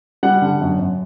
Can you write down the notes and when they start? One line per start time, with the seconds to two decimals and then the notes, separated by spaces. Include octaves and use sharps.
0.23 G3 F#5
0.42 D3
0.61 F#2
0.79 F#2